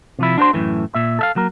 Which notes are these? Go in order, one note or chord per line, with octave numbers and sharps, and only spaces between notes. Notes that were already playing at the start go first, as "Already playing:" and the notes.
C3 F3 E4
D4 F4 F#4 C5 C6
F#2 A2 E3 A3
A#2 E5
A4 E5 F5
F#3 A#3 A#4